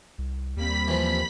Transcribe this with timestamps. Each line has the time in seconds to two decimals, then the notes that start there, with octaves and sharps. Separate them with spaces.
0.18 C2
0.56 D#2 G3 A#3 C4 B5 B6
0.88 E3 F3